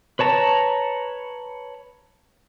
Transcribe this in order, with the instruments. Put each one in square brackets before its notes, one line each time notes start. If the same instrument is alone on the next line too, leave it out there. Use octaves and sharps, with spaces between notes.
[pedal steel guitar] B4 C#5 A5 A#5